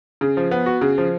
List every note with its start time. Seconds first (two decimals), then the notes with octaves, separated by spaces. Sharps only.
0.21 C#3
0.37 F3
0.51 B3
0.66 F#4
0.81 C#3
0.98 F3